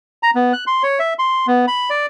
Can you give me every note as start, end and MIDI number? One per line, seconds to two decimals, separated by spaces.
0.23 0.31 82
0.35 0.53 59
0.53 0.64 90
0.67 0.83 84
0.83 0.99 73
0.99 1.14 76
1.19 1.47 84
1.47 1.66 59
1.68 1.90 83
1.90 2.06 74